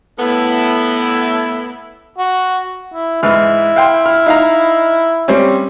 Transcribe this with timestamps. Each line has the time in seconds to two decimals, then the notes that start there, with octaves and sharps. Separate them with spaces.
0.19 A2 B3 E4
2.18 F#4
2.94 E4
3.23 G#2 E3 E4 F6
3.76 F5 G5 C6
4.06 F6
4.26 D#4 F5 A#5
5.28 G3 C4 C#4